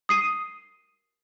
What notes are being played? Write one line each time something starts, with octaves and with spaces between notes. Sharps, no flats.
D#6 C7 D#7